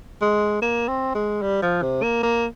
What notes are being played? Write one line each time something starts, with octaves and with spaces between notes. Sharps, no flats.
G#3
A#3
C4
G#3
G3
F3
C3
A#3
A#3